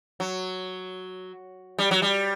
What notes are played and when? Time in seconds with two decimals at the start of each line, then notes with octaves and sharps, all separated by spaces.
0.20 F#3
1.79 G3
1.91 F#3
2.02 G3